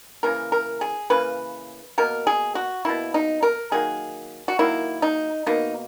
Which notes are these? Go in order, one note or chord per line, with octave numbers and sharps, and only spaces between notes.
C#3 E3 A#3 A#4
A#4
G#4
C#3 E3 A#3 B4
B2 A#3 A#4
G#4
F#4
B2 A#3 E4
D#4
A#4
D#3 F#3 A#3 G#4
F#4
D#3 F#3 A#3 E4
D#4
B2 A#3 D#4